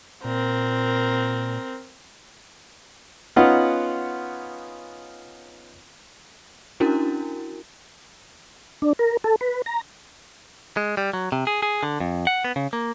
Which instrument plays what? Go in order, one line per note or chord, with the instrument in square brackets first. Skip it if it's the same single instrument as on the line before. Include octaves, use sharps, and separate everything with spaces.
[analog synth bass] A#2 [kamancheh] C4 A#4
[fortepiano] B3 C#4 D#4 F4 F#5
[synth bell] C#4 D4 E4 F#4 A#4
[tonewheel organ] D4
A#4
A4
B4
A#5
[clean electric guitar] G#3
G3
F#3
C3
G#4
G#4
D3
F2
F#5
B3
C#3
A#3